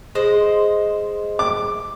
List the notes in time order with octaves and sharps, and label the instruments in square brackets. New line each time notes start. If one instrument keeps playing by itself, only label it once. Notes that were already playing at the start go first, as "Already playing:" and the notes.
[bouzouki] G#3 C5 D#5
[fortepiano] D6